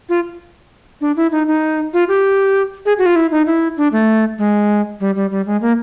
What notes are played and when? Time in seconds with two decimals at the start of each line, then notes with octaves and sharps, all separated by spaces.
0.09 F4
1.01 D4
1.16 E4
1.32 D#4
1.48 D#4
1.94 F4
2.08 G4
2.86 G#4
2.98 F#4
3.06 F4
3.16 E4
3.31 D#4
3.47 E4
3.77 D4
3.92 A3
4.38 G#3
5.00 G3
5.16 G3
5.31 G3
5.46 G#3
5.62 A#3